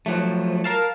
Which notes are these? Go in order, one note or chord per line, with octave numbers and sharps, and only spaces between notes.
F3 F#3 A3
A#4 F5 A5